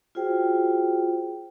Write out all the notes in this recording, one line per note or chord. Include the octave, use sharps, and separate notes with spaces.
F4 F#4 G#4 C5 G5